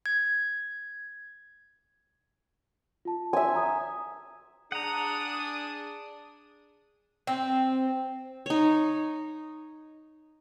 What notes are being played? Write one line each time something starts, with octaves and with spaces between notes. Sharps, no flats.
G#6
F4 A5
E5 G#5 C6
A#5 D#6
D4 G#4 F#5 A#5 D#6
C4
D#4 C#5